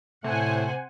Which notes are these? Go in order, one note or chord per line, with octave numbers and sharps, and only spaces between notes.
A2 C3 A3 C5 F#5 G#5